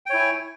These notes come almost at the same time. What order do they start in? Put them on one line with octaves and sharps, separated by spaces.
G5 C#5 E4 G#5